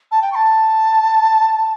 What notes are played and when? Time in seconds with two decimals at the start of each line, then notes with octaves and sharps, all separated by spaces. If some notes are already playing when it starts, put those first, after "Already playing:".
0.12 A5
0.22 G5
0.32 C#6
0.35 A5